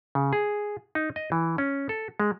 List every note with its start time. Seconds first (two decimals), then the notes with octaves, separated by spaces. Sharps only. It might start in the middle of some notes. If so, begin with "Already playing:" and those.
0.15 C#3
0.33 G#4
0.95 D#4
1.16 D#5
1.32 E3
1.58 C#4
1.89 A4
2.20 G#3